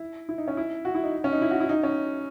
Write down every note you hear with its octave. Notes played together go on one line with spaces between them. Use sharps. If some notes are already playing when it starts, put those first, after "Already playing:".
Already playing: E4
E4
D#4
C#4
E4
F#4
E4
D#4
C#4
D#4
E4
F#4
E4
D#4
C#4